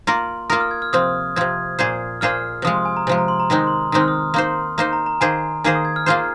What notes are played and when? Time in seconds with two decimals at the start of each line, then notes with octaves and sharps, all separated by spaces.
0.07 A#3 F4 A#4 C6
0.50 A#3 F4 A#4 D#6
0.60 F6
0.71 G#6
0.82 F6
0.93 C3 F3 C4 D#6
1.36 C3 F3 C4 G#6
1.79 A#2 A#3 G#4 C5
2.21 A#2 A#3 G#4 C5 F6
2.62 C3 F3 G#3 D#6
2.74 C6
2.85 G#5
2.97 A#5
3.07 C3 F3 G#3 G#5
3.18 A#5
3.28 C6
3.40 A#5
3.49 D#3 G#3 C4 D#4 C6
3.59 D#6
3.67 C6
3.92 D#3 G#3 C4 D#4 D#6
4.01 F6
4.08 D#6
4.34 A#3 D#4 C5 C6
4.78 A#3 D#4 C5 A#5
4.93 A#5
5.06 A#5
5.21 D#3 A#3 G#4 C5 G#5
5.64 D#3 A#3 G#4 C5 G#5
5.75 D#6
5.85 G#6
5.96 F6
6.06 A#3 F4 G#4 C5 F6